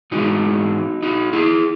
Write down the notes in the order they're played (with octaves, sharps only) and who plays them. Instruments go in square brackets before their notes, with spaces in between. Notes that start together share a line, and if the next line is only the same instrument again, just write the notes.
[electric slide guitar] G#2 E3 G#3 D#4 F#4
D#4 F#4
E4 G#4